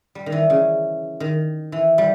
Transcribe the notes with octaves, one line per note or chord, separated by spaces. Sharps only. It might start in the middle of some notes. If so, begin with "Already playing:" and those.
G3
D#3
E3
C#3
D#3
E3
G3